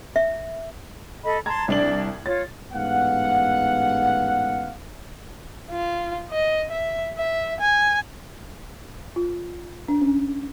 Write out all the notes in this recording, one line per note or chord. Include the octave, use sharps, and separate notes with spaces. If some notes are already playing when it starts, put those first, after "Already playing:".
E5
A4 D#5 B5
A5 A#5 C6 G#6
C2 D4 D5 F#7
F4 C#5 A6
A1 G#2 B3 F5 F#5
F4
D#5
E5
E5
G#5
F4
D4
C#4